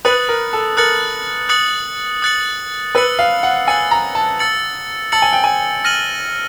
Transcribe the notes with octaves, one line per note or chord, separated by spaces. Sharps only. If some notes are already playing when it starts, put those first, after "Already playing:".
B4 D#6 F#6 A6 C#7 F#7
A#4
A4
A#4 D#6 F#6 A6 C#7 F#7
D#6 F#6 A6 C#7 F#7
D#6 F#6 A6 C#7 F#7
B4 E6 A6 C#7 F#7
F5
F#5
G#5 E6 A6 C#7 F#7
A#5
A5
E6 A6 C#7 F#7
A5 E6 A6 C#7 F#7
G#5
G5
G#5
F6 A#6 D#7 F#7